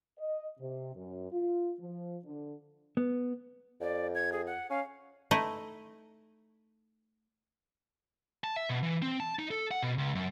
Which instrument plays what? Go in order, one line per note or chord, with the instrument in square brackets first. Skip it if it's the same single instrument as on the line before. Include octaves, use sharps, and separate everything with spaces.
[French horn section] D#5
C3
F#2
F4
F3
D3
[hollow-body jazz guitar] B3
[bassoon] F2 [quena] D5
[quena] G#6
G#4
F#5
[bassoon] C#4 [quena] F5
[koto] A3 D#4 E4 D#5
[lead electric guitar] A5
E5
B2
E3
C4
A5
D#4
A4
F#5
B2
C#2
F#2